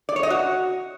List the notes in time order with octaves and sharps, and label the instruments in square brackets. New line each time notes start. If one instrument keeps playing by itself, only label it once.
[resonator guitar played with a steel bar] D5
C#5
D#5
F#4